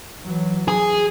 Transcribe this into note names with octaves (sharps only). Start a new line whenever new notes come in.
E3 F#3
G#4